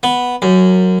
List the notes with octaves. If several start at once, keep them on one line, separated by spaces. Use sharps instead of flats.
B3
F#2